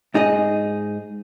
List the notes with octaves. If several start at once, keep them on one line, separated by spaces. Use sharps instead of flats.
G#2 D#4 G#4 D#5